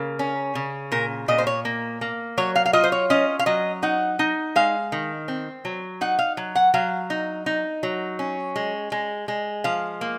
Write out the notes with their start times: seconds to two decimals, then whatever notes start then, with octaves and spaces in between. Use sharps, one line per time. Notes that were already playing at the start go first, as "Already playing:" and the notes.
Already playing: C#3 A#3 A#4
0.19 C#4
0.55 C#3
0.92 A#2 A#4
1.28 A#2 D#5
1.38 C5
1.47 C#5
1.65 A#3
2.01 A#3
2.38 F#3 C#5
2.55 F5
2.66 F5
2.73 F4 D#5
2.84 C5
2.92 C#5
3.10 C#4 D#5
3.39 F5
3.46 F#3 D#5
3.83 D#4 F#5
4.19 D#4
4.56 G#3 F5
4.92 D#3
5.28 C4
5.65 F#3
6.01 D#4 F#5
6.19 F5
6.37 F#3
6.55 F#5
6.74 F#3 F5
7.10 D#4
7.46 D#4
7.83 F#3
8.19 C#4
8.56 G#3
8.92 G#3
9.28 G#3
9.64 F3 F5
10.01 A#3